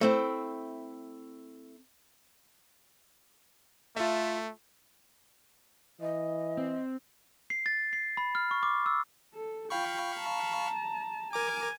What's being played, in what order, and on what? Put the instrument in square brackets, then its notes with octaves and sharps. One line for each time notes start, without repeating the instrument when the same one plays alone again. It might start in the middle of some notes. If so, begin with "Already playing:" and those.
[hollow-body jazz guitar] A3 C4 E4
[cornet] A3 [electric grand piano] F4 A4 E5
[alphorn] E3 [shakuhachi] D#5
[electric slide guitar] C4
[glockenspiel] C7
A6
C7
B5
F6
C#6
D6
E6
[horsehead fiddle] A4
[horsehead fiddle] F4 G5 [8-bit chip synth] F5 B5 C#6
[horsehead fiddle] A5 A#5
[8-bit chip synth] A#4 A#5 D6 [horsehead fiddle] G#5